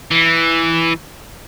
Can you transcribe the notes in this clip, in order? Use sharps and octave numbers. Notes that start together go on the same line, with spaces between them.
E3